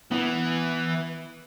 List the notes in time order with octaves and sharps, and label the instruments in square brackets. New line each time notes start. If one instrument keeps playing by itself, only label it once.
[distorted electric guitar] E3 [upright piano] B3